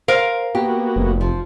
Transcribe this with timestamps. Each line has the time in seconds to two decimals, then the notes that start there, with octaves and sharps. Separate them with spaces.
0.08 A#4 C5 F5
0.55 A#3 B3 F#4 G4
0.96 F1
1.21 F3